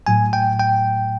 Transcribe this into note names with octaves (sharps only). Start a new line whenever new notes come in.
A2 F#3 G#5
G5
G5